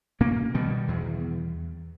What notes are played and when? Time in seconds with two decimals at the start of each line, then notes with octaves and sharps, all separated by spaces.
0.20 B2 A#3 C#4
0.54 B2 D#3 G3
0.88 E2